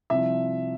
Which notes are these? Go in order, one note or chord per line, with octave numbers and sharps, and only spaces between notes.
C2 C3 F3 E5